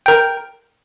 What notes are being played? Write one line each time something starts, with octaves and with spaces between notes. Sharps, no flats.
A#4 G5